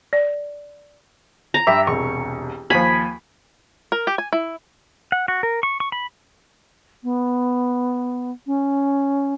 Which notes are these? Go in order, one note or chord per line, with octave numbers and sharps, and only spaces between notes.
D5
A#5
G2 E5 G5 D6
E1 C2 C#6
D#2 F3 G#5 B5
A#4
G4
G#5
E4
F#5
F#4
A#4
C#6
C#6
B5
B3
C#4